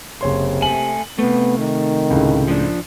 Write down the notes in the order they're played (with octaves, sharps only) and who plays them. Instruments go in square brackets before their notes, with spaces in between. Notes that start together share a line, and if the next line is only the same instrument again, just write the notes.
[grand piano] F#1 C#5 C6 [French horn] C3
[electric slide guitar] A3 G#5 [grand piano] F#7
[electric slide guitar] C3 A3 [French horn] B3
[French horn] D#3
[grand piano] C#2 A2 C#3
[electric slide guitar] F3 D4